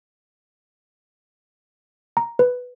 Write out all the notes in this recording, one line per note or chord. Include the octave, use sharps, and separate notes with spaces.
A#5
B4